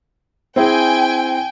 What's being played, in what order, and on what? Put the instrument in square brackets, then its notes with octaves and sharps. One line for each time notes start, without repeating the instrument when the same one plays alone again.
[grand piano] C4 E4 G#4 [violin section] G5 G#5